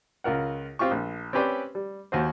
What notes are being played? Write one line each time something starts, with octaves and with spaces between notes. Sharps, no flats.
C#2 F4 A#4 F#5
C4 F4 G4 C#6
A#1
C4 C#4 G4 B4 C5 D5
G3
D#2 F#4 C5